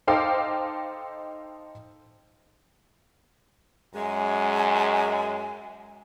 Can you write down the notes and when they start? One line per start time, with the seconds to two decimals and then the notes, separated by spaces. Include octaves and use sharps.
0.07 D#4 A4 C5 F5 G5 D6
3.95 F#2 G#3 G#5